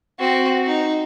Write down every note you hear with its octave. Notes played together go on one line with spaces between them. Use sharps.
C4 F#4
D#4